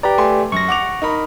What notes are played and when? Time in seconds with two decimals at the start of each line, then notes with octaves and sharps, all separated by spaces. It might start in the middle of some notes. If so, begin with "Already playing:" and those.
0.03 G4 B4 D5 A#5
0.18 A3 G#5 C6
0.52 F#2 C#6 A#6
0.68 F#5 D6 F7
1.02 D#4 A#4 B5